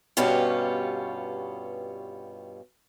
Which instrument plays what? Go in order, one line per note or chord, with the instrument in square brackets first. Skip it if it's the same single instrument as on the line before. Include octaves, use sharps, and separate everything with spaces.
[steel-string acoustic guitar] G2 B2 B3 C#4 F4 G4